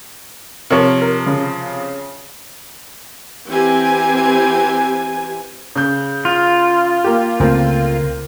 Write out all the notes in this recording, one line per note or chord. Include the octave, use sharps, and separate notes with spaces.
C3 F3 A#4 C#5
A#4
C#3
E3 C4 G4 G#5
C#3 G6
F4
A#3 G4
C#2 A3 A#3 C4